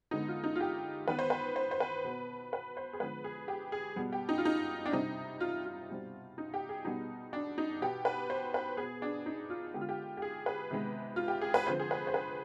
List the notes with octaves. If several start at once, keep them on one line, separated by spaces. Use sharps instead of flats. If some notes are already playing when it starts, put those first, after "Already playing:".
D3 G#3 B3 D#4
F4
D#4
F4
G4
D#3 B3 B4
C5
B4
C5
C5
B4
B2 B3
B4
C5
G#4
D3 F3 G#3 B3 B4
G#4
G4
G#4
B2 G3 B3
G4
D#4
F4
D#4
D4
C3 G3 C4 D#4
F4
F4
B2 G3 C4
D#4
G4
G#4
B2 G3 B3 D#4
D4
D#4
B2 B3 G4
B4
C5
B4
B2 B3 G#4
D4
D#4
F4
D3 G#3 B3 G4
F4
G4
G4
G#4
B4
C3 D#3 G#3 B3
F4
G4
G#4
B4
D3 F3 C4 C5
G#4
B4
C5
B4